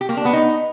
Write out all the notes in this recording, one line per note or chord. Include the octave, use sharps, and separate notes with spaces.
G4
A#3
D4
B3
D#4